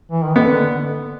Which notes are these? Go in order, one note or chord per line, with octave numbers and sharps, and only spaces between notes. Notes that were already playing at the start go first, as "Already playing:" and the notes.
E3
D#3
D3 B3